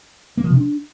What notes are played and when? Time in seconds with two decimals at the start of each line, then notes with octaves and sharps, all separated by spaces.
0.37 A#3
0.44 F3
0.50 C3
0.57 D4